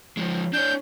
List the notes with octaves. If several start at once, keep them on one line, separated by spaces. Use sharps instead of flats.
F3 G#3
D4 C#5 G6